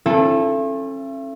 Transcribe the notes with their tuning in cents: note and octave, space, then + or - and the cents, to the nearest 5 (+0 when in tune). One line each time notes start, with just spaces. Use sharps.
C#4 -40 E4 +45 A4 +0